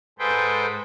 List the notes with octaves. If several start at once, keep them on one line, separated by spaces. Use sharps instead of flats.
G#2 G#4 A4 B4 C5 G5